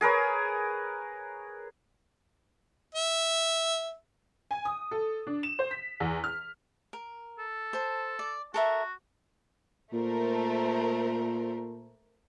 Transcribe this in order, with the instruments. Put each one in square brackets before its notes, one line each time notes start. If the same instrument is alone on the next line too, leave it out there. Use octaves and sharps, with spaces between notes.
[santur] G#4 A#4 B4 C#5
[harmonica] E5
[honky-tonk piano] G#5
D#6
A4
D4
E7
C5
B6
E2
F6
[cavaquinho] A#4
[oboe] A4
[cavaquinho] C5 A5
D5
[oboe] F#4 [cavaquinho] A4 A#4 E5
[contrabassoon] A#2 [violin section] A3 A#4 C5